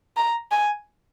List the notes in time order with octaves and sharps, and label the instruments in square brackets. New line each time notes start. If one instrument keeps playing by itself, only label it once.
[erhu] A#5
G#5